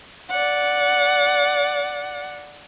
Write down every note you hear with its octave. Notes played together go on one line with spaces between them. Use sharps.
D5 F#5